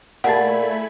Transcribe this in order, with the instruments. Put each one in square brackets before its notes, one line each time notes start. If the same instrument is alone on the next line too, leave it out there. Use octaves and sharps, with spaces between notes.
[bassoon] A#2 [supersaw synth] A3 B5 G#6 [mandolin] E4 G#4 A5 [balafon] F#5